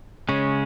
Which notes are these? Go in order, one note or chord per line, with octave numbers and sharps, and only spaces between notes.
C#3 G#3 C#4